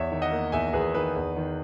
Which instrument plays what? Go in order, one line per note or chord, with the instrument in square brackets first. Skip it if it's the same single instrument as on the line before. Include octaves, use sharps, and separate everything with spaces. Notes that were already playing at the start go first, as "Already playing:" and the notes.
Already playing: [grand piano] E2 C#5 E5
D#3
D#5 F#5
A#3
E2 E5 G#5
E2 G#4 B4
D#3 G#4 B4
E2
D#3